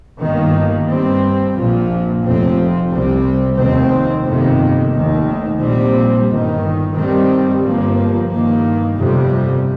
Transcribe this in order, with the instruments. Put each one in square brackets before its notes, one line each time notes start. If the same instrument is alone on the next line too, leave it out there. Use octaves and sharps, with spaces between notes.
[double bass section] G1 G2 D#3 A#3
G2 G3 C4
A#1 A#2 F3
F1 F2 F3 C4
C2 C3 G3 C4
F1 D#2 D#3 C4
G1 F2 C3 D#3 A#3
F1 D#2 D#3
A#1 A#2 G3 C4
G1 G2 D#3
G2 D#3 G3 C4
G1 G2 F3 A#3
G2 D#3 A#3
G1 F2 C3 G3